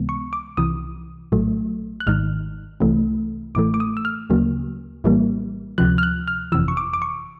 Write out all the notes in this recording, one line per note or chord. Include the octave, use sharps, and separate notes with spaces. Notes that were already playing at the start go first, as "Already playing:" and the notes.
Already playing: C#2 C3 E3 G#3 B3
C#6
D6
C2 C3 E3 D#6
A#1 A2 F#3 A3
F#6
G#1 G#2 D#3 F6
C2 C3 E3 A3
A1 A2 E3 A3 D6
D6
D#6
E6
F6
D2 C#3 F#3 A#3
A#1 A2 E3 G3 A#3
D2 C3 F3 F#6
F6
F#6
F6
G1 F2 C3 E3 E6
C#6
D6
D6
C#6